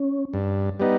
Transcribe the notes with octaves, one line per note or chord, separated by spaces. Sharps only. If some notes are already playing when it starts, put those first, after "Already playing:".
Already playing: C#4
G2
G3 B3 D#4